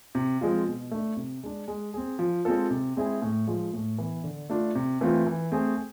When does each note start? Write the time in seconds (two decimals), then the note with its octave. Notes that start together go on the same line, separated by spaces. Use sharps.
0.15 C3
0.41 F3 G#3 C4 F4
0.66 B2
0.91 A3 D4
1.17 C3
1.43 G#3 D4
1.68 G#3
1.94 C4 G#4
2.19 F3
2.45 G#3 C4 F4 A4
2.70 C3
2.97 G#3 C4 E4 G#4
3.22 A2
3.47 F3 G#3
3.73 A2
3.98 E3 B3
4.24 D3
4.50 A3 D4 F4
4.75 C3
5.01 E3 A3 C4 F4
5.26 E3
5.52 A3 C4 G#4